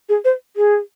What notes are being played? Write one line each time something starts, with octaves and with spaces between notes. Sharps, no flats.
G#4
C5
G#4